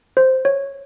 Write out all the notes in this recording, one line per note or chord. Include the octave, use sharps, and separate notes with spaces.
C5
C#5